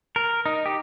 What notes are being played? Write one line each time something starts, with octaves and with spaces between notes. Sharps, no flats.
A#4
D#4
G4